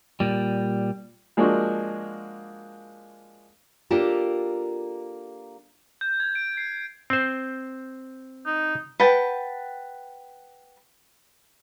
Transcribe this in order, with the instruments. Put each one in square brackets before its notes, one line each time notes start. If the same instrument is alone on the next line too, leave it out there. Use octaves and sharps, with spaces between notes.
[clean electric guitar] A#2 G3
[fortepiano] F3 G#3 A#3 D4 F4 F#4
[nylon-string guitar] A#3 D4 F4 G4 A4 A#4
[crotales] G6
G#6
D7
C7
[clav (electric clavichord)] C4 C5
[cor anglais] D#4
[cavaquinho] B4 F#5 G5 A5